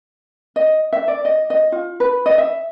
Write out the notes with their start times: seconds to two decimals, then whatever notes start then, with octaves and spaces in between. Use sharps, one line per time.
0.56 D#5
0.93 E5
1.08 D5
1.25 D#5
1.50 D#5
1.72 F4
2.00 B4
2.26 D#5
2.38 E5